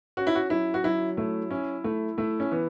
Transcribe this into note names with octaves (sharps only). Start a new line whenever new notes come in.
C#4 F#4
E4
F#4
F#3 E4
F#4
F#3 E4
A3 E4
C#4 E4
A3 E4
A3 E4
C#4
E3 B3